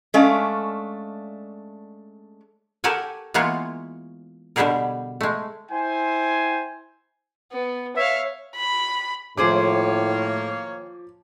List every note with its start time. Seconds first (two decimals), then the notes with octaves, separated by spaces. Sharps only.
0.14 G#3 A3 C#4 D4 D5 F5
2.84 G4 A4 A#4 C#5 F#5 G#5
3.34 E3 G#3 A#3 B3 F4 C#5
4.56 B2 D3 G3 G4 G#4 A#4
5.21 G#3 A3
5.71 E4 C5 G5 G#5
7.52 B3
7.96 C#5 E5 F5
8.56 B5
9.37 A2 D#3 F3 A#3 G#4 C5 C#5 D6